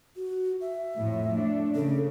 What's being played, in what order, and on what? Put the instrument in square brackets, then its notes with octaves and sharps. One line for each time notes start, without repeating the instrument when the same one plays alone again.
[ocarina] F#4
E5
[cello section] F2 A2
A3 D4
[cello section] C#3 [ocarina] A4